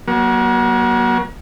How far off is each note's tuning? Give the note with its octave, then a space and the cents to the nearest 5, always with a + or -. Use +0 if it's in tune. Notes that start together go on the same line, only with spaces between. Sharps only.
F#3 +10 A#3 +40